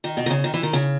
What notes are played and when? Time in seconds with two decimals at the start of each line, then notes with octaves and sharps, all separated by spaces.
0.04 D#3
0.17 B2
0.26 D#3
0.30 C#3
0.44 D#3
0.54 E3
0.63 D#3
0.73 C#3